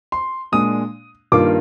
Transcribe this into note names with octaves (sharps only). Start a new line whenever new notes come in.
C6
A#2 G#3 D4 D#6
G2 D#3 A#3 F4 D6